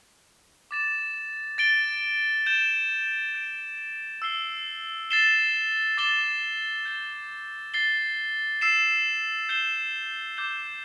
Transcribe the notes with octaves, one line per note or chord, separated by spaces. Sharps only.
D6 A6 E7
A6 D7 G7
G6 E7 G7
G6 D7 G7
E6 C7 G7
A6 C7 E7 G7
D6 A6 E7 G7
G6 C7 E7 G7
A6 C7 G7
E6 C7 E7
G6 C7 E7 G7
D6 G6 E7 G7